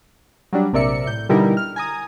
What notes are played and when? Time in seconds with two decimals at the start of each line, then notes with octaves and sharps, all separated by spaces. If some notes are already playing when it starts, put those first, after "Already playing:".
0.53 F#3 G3 D4
0.73 A#1 C3 A#4 D5 E5 C#7
1.07 A2 G6
1.29 B2 D3 G3 D#4 E4 A#4
1.57 F6
1.76 G#5 A#5 D#6